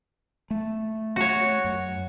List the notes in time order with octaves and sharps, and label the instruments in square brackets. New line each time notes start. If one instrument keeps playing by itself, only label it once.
[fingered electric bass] A3
[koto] F#4 C#5
[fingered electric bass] F#2